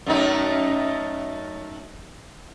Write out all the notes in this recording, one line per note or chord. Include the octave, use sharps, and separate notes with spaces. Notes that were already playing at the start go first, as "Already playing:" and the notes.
F#2 A3 D#4